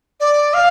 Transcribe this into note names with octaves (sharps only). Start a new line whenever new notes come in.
D5
F5